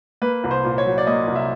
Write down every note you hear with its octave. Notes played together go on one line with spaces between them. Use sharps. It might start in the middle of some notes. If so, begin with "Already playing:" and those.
A#3 B4
C2
C5
A#2
C#5
F#3
D5
A#3 D#5
C2
E5